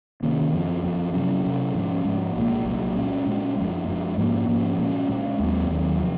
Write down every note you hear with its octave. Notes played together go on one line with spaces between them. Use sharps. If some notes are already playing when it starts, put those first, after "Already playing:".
C3 D#3 A#3 C#4
F#2 F3 C4
F#2 F3 C4
C3 F#3 C#4
C3 F#3 C#4
G#2 F3 G#3 C#4
G#2 F3 G#3 C#4
C2 A#2 F#3 A#3
C2 A#2 F#3 A#3
A#2 G#3 C#4
A#2 G#3 C#4
F#2 F3 G#3
F#2 F3 G#3
G#2 F3 A#3 C#4
G#2 F3 A#3 C#4
A#2 G#3 C#4
A#2 G#3 C#4
D#2 D#3 F#3 C4
D#2 D#3 F#3 C4
C3 F3